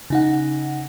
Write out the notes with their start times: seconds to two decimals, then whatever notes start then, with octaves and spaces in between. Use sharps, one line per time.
0.10 C#3 D#4 F#5